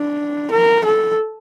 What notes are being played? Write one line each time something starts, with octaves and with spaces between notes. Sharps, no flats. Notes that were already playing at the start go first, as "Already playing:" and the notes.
Already playing: D4
A#4
A4